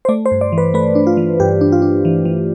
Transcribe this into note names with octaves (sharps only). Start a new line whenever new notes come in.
C5
A3 D5
C5
G2
D5
E3
B4
A3 B4
D4
F4
E3
G2 G4
D4
F4
D4
E3
E3